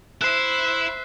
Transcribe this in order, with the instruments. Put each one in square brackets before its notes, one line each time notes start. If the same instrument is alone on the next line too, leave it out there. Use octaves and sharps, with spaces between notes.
[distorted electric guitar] E4 [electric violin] C5 E5 [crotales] F#6 C7